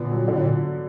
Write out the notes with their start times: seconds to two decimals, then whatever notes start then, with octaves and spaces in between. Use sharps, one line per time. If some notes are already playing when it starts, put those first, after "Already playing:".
Already playing: A#2 D3 B3
0.11 F#3
0.28 A2 D3
0.38 A#2